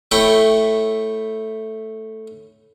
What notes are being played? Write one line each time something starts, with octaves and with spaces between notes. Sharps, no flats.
A3 E4 C#5 G5